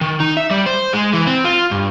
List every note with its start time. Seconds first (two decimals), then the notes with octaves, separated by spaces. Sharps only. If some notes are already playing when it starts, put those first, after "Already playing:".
0.01 D#3
0.20 D#4
0.37 E5
0.51 G3
0.66 C5
0.93 G#3
1.13 E3
1.27 C4
1.44 F4
1.71 G2